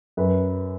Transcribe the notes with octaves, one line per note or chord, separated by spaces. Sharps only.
F#2 B4